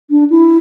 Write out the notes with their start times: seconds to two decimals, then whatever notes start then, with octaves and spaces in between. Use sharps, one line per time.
0.10 D4
0.30 E4